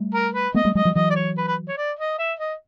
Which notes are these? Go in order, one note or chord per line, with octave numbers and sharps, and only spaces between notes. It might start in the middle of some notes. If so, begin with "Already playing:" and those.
Already playing: G3 A3
A#4
B4
A3 B3 D#5
G3 A3
F#3 G#3 D#5
F3 G3
E3 F#3 D#5
D5
C#5
B4
B4
C#5
D5
D#5
E5
D#5